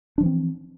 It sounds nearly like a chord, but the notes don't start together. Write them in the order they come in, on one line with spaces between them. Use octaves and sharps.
D4 F3 E3 C4